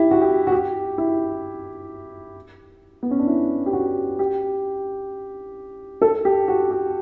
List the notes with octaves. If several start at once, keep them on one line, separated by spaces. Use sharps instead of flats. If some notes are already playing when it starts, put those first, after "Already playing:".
Already playing: E4 G4
F#4
G4
F#4
G4
E4
B3
C#4
D4
E4
G4
F#4
G4
A4
G4
F#4
G4